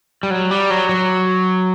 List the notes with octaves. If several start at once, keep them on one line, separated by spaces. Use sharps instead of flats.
G3
F#3
G3
F#3
F#3